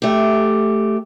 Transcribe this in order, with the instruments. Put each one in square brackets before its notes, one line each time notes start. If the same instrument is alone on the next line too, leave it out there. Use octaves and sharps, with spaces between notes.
[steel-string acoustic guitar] A3 G4